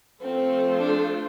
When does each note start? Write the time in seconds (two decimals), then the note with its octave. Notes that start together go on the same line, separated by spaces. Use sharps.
0.21 F3 A3 C4 F4 A4 C5
0.80 D4